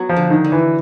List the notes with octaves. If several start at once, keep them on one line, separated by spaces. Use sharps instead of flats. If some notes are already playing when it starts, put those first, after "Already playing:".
Already playing: F#3 B3
F3
D3
D#3
D3
E3